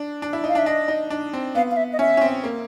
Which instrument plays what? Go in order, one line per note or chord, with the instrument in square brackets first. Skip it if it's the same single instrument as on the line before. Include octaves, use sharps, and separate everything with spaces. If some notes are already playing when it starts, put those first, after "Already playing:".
Already playing: [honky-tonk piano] D4
D4
E4
[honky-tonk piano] D#4 [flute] F5
[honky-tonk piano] D4
[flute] E5
[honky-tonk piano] D4 [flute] D#5
[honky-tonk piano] D#4
D4
C4
[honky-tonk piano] B3 [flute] F5
[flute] F5
E5
D#5
[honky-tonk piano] C#4 [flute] E5
[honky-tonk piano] C#4
C4
A#3